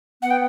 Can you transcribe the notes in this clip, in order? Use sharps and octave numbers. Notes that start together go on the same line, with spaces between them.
B3 F#5
G5